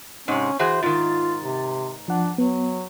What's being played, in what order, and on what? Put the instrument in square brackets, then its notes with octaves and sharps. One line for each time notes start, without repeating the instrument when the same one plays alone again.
[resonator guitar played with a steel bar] G#2 C3 [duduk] C#4
[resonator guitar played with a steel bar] E3 F#4 G#4 [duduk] C5
[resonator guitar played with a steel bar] G#2 D#3 [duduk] F4 [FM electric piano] A6
[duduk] C3
[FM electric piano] F3 F#5 [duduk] D4
[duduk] F#3 [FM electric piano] B3